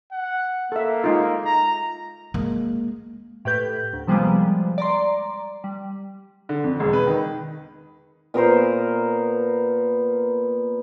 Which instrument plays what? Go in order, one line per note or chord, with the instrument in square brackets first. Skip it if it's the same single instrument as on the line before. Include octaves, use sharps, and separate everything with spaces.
[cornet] F#5
[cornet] A#3 [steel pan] A4 E5
[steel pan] G#3 D#4 F4
[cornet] A#5
[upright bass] G#3 A#3
[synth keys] A2 G4 B4 G6
D2
C3 F3 G3 G#3 A#3 B3
D5 A#5 C6
G3
[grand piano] D3
F2
E1
B4
D#3
[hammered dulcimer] A#2 B3 A#4 C5